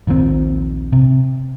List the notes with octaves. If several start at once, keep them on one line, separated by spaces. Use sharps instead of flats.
A#1 D#2 A#2 C4
C3